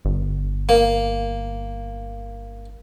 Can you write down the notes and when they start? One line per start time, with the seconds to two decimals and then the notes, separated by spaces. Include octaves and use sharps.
0.05 G1
0.69 A#3